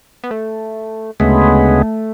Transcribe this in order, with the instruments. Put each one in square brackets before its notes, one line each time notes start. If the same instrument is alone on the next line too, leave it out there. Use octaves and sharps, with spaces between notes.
[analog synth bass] B3
A3
[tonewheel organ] D2 C#3 G#3 B3 [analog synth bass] A3